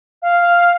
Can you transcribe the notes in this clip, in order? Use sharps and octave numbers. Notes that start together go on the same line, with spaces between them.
F5